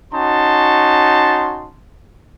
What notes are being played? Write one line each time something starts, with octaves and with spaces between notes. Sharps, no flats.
C#4 D#4 F#4 A5 C6